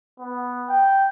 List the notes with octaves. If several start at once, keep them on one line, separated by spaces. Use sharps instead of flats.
B3
G5